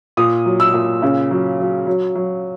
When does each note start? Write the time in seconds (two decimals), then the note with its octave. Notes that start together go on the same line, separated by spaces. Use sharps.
0.17 A#2 D#6
0.45 F#3
0.60 E6
0.74 A#2
1.02 C#3
1.31 F#3
1.59 F#3
1.87 F#3
2.15 F#3